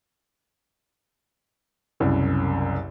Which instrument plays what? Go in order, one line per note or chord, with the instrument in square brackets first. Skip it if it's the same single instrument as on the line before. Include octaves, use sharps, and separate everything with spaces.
[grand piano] F#1 C2 F#2